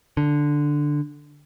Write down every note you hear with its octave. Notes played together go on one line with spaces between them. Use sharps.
D3